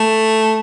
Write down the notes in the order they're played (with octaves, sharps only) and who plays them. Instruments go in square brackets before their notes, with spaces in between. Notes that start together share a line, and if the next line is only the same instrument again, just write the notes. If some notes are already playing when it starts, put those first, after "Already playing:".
Already playing: [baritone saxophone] A3